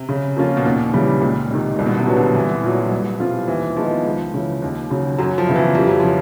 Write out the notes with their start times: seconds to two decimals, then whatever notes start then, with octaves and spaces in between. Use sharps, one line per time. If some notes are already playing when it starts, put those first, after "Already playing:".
Already playing: C3
0.09 C#3
0.36 F3 A#3 C#4 F4
0.57 B2
0.65 D#2 A#2
0.93 C#3 E3 G3
1.21 C#2 A#2
1.50 C3 D#3
1.75 C2 A#2
1.86 B2
1.98 C3
2.07 A#2 F#3 B3 D4
2.16 D3
2.35 C2 E3
2.64 A#2 F#3
2.92 C2
3.20 B2 G3 C4 F4
3.48 D#2 E3
3.76 D#3 F3 G#3 B3
4.05 C#2
4.34 C#3 E3
4.62 D#2
4.90 C#3 F#3
5.18 F#2 F#3
5.38 F3
5.47 C#3 F#3 B3 E4
5.56 E3
5.75 F2 G3
5.87 F#3
6.00 C#3 F3